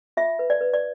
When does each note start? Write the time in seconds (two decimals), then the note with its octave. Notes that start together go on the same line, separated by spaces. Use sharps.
0.17 F4 E5
0.39 B4
0.50 D5
0.61 B4
0.74 D5